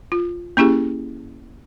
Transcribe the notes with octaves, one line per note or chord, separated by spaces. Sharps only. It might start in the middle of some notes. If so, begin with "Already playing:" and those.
F4
A#3 C#4 E4 G4 G#4